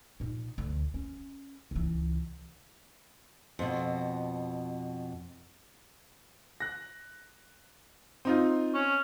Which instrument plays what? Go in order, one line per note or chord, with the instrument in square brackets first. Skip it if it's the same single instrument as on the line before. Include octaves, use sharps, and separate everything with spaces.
[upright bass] A#2 D#4
D2
C#4
C#2 E3
[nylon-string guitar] F2 B2
[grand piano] F#6 A#6
C4 D#4 F4
[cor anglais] C#4